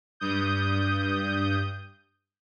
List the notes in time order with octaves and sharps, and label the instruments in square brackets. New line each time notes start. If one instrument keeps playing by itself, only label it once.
[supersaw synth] G2 D#6 G6